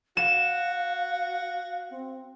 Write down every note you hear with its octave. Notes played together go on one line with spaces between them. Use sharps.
F#4 F5 E7
C4